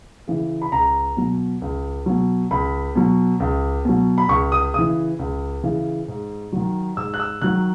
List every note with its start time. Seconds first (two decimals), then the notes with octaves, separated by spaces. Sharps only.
0.28 C#3 E3
0.62 B5
0.72 C#2 A#5
1.17 B2 F#3
1.62 C#2
2.06 B2 F#3
2.51 C#2 B5
2.96 B2 F#3
3.40 C#2
3.85 B2 F#3
4.18 B5
4.29 C#2 C#6
4.52 D#6
4.74 C#3 D#6
4.79 E3
5.19 C#2
5.63 C#3 E3
6.08 G#2
6.52 D#3 F#3
6.97 G#2 E6
7.14 F#6
7.20 E6
7.41 D#3 F#3 F#6